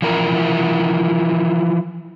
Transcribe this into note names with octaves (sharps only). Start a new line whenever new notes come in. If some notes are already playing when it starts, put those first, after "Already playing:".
E3 F3 E4 A#4